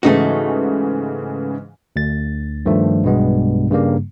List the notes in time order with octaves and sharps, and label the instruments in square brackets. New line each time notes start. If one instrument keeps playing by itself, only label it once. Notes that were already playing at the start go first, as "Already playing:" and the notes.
[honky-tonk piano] G#2 C#3 E3 [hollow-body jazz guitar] A3 D#4 F#4
[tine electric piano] D2 A6
G2 D#3 F3 A3
B1 G2 B2 G#3 B3
G2 C#3 G3 A#3